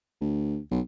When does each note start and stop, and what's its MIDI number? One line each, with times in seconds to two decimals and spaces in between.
0.21 0.58 38
0.71 0.80 35